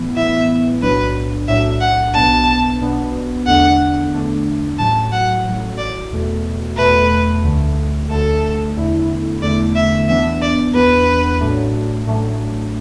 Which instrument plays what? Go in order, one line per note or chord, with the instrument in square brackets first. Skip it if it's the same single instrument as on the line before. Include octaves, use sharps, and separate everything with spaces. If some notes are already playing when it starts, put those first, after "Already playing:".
Already playing: [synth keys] A2 E3 B3 E4
[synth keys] A2 E3 B3 E4 [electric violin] E5
[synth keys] B1 A2 F#3 D4 [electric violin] B4
[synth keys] B1 A2 F#3 D4 [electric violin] E5
[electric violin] F#5
[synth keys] B1 B2 B3 D4 [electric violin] A5
[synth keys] B1 B2 B3 D4
[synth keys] E2 D3 A3 D4 [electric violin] F#5
[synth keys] E2 D3 A3 D4
[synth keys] A1 A2 F#3 [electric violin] A5
[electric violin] F#5
[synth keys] A1 A2 F#3
[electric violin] D5
[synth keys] E2 B2 A3
[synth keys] E2 B2 A3 [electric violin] B4
[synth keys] D2 D3 A3
[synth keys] D2 D3 A3 [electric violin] A4
[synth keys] E2 D3 A3 E4
[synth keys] E2 D3 A3 E4 [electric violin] D5
[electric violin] E5
[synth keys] E2 E3 B3 D4 [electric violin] E5
[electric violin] D5
[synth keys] E2 E3 B3 D4 [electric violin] B4
[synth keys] A1 A2 F#3 A3 D4
A1 A2 F#3 A3 D4